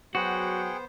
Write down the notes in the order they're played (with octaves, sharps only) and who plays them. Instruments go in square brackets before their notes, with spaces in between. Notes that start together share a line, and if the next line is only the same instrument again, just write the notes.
[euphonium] F#3 [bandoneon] B3 C5 [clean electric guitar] F#4 [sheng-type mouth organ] G#4 F#5 G5